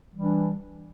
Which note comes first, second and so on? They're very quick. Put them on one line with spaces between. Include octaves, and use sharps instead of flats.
E3 G3 D4